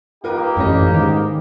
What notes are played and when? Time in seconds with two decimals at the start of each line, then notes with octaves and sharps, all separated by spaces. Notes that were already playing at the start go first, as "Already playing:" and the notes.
0.24 A#3 D#4 F4 G4 A#4 B4
0.57 A1 F#2 G3 C#4 D#5
0.93 G#2 D#3